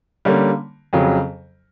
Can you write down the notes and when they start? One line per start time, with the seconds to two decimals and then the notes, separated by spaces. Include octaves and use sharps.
0.25 D3 G3 A#3 C#4
0.93 F2 C#3 F#3